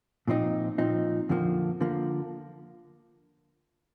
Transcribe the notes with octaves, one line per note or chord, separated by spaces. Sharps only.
A#2 F3 C4 D#4
A#2 F3 C4 D#4
F2 D3 F3 A#3
D3 F3 A#3